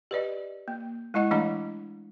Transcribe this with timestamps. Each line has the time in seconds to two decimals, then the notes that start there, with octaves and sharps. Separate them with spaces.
0.11 G4 B4 D5 D#5
0.68 A#3
1.14 G#3 E4 D#5 F#5
1.31 E3 A3 D4 D#5 A#5